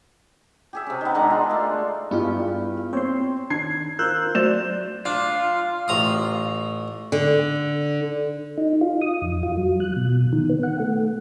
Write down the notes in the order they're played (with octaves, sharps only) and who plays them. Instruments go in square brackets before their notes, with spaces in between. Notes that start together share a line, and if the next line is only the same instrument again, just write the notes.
[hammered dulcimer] G4 G#4 E5
C3 C#4
D#3 B3
G#3 D4 A#4 F#5
F4
A3 F5
[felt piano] G2 G3 [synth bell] B3 F4 [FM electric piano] E4 G#4
[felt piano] C4 [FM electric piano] C#5 C6
[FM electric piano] D#3 [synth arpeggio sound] D4 [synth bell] G#6 [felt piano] C7
[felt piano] F4 [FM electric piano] A#4 C5 [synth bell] E6 F#6 G6
[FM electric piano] F#3 [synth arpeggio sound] A3 D5 [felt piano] C5 E7 [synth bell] G6
[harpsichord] D4 [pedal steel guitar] F4
[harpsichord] A1 A#5 D#6
[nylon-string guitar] D3
[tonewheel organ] D#4
F4
D#6
F2
F4
F#3
F#6
B2
D#3
B3
F#5
A3